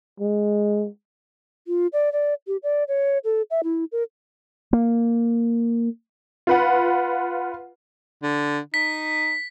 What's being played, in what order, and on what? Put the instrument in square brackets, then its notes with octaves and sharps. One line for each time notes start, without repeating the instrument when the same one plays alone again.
[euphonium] G#3
[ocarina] F4
D5
D5
G4
D5
C#5
A4
E5
E4
A#4
[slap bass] A#3
[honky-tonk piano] F4 B4 F#5
[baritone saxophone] D3
[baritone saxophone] D#4 [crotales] B6